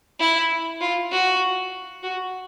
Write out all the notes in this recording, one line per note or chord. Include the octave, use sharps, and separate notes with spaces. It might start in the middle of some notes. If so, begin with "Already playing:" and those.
E4
F4
F#4
F#4